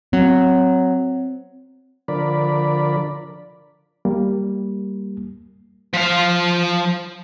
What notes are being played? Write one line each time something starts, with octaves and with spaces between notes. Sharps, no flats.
F#3 C4
D3 F3 A#4 D5 B5
G3 A#3
F3 F5